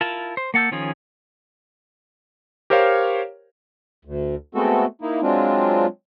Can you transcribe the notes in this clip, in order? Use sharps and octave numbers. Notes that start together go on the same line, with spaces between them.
E4 F4 A#4 A5
C5
A#3 F#5 A5 E6 G6
D#3 F3 C#4 F4 G#4
G4 A#4 C5 C#5 F5
D2
G#3 A3 B3 C4 F#4 A4
A#3 D#4 E4
F#3 G#3 C4 D4 F4